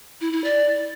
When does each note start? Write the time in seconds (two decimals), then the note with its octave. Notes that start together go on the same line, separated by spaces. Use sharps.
0.21 E4
0.33 E4
0.44 D5